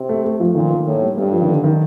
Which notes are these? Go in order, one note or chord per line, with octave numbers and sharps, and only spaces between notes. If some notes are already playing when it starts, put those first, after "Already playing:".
Already playing: C3
A3
A3
F3
A#2 D#3
D#3
A2 A#3
G3
G2 G3
F3
D#3
D3
D#3